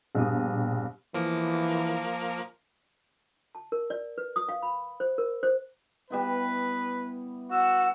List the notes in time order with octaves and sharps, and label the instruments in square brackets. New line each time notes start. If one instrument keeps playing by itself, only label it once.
[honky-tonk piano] A#1 G2 B2 G4 D#6
[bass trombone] E3 [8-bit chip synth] F3 A#3 A#4
[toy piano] A5
A#4
D5
B4
D#6
F5
B5
C5
A#4
C5
[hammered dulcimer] G3 B3 E4 [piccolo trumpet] B4
[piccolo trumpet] F#4 [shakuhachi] F#5 [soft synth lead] E6